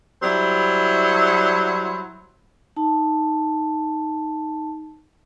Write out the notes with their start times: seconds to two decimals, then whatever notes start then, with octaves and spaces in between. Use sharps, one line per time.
0.23 F#3 G3 E4 C5
2.77 D#4 A5